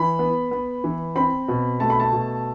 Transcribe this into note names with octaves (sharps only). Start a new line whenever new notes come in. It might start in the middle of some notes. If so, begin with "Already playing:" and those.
Already playing: E3 B5
B3
B3
E3
C4 B5
B2
A3 A5
B5
A5
B2